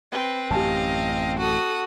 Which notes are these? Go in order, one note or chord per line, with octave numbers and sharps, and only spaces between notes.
C4 B4
A1 F#2 G4 D#5 F5 G#5 A5
F#4 A4 D#6